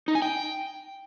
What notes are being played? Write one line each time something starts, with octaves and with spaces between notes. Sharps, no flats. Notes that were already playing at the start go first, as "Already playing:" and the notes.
D#4
G#5
G5